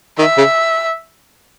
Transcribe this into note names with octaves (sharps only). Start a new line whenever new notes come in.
D#3 E5
C#3